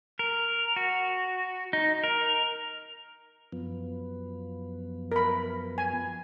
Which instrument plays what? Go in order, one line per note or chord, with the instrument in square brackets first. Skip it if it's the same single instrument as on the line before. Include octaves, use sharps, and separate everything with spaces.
[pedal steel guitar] A#4
F#4
D#4
A#4
[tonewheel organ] F#2 F3 B3
[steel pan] A#4 B5
G#5